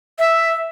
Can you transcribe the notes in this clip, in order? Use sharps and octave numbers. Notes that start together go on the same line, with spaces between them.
E5